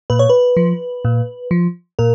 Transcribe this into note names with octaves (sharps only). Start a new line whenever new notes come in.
A#2 B4
C#5
B4
F3
A#2
F3
A#2 A#4